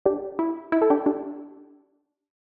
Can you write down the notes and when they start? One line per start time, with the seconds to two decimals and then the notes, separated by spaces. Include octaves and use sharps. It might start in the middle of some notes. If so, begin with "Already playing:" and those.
0.06 D4 G4
0.39 E4
0.72 E4
0.82 A4
0.90 D4 G4
1.06 D4 G4